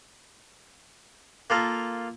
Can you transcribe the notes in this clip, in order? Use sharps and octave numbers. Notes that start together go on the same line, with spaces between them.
A#3 F4 A4 A#4